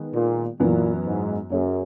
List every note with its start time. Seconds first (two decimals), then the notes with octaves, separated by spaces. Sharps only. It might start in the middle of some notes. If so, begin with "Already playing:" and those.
Already playing: D#3 G#3 B3
0.14 A#2
0.59 F#2 A#2 E3 B3
1.05 G#2
1.50 F#2 A#3 C#4 G#4